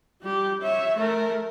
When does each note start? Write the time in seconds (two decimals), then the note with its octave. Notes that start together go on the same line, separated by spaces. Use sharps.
0.22 G3 G4
0.62 C#5 E5
0.97 A3 A#4